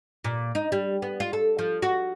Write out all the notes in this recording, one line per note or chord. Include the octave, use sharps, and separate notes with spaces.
A#2
D#4
G3
B3
F4
A4
F3
F#4